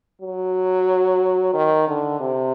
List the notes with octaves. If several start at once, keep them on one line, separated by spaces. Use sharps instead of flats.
F#3
D#3
D3
C3